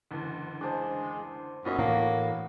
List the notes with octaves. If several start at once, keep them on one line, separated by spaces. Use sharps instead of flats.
F#1 D2 E3
G#3 D4 C5
F#2 A#2 B3 D#4 F#4 C#5
E2 A2 A#3